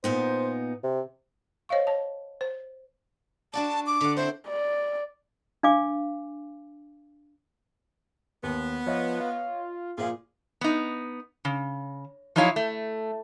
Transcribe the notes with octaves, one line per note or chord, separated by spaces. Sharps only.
A#2 B3 D#4 C5
C3
C5 C#5 D#5 F5 C#6
C#5 A5
C5
D4 F#4 D5 A5
D6
D3 F#5
C4 E4 C5
D5
D4 F5 G#5 D6
D#2 B3
F3 C#5 D#5
F4
A#2 F3 F4 G#4 F5
B3 D#4
C#3
F3 F#3 D#4 E4 C#5 F5
A3